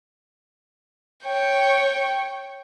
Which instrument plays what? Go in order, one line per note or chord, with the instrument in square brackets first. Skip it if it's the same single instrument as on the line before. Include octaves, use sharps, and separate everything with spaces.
[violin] C#5 G5